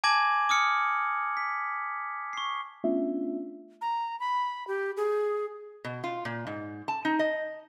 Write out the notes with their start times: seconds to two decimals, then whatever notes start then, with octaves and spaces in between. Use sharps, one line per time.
0.04 G#5 A5 D6 G#6 A#6 F#7
0.49 D6 D#6 F6 C#7
1.37 B6
2.33 C#6 C7
2.84 A3 B3 C#4 D4 F4 E5
3.81 A#5
4.20 B5
4.67 G4
4.97 G#4
5.85 B2
6.04 F4
6.25 A#2
6.47 G#2
6.88 A5
7.05 D#4
7.19 D#5